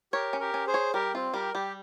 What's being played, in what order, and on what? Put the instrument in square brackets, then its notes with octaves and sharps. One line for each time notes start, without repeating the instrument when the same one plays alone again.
[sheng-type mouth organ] G4 A#4 [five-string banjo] C#5
[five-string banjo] C#4
[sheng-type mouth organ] G4 A#4
[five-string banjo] C#4
[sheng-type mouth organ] G#4 C5
[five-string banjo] C#5
[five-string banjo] G3 [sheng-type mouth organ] G4 A#4
[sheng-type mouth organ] C4 [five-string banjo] F4
[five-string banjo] G3 [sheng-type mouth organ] G4 A#4
[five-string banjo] G3 [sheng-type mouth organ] G4